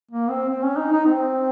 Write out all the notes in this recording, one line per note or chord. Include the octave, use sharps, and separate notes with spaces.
A#3
C4
C4
C#4
D#4
D#4
C4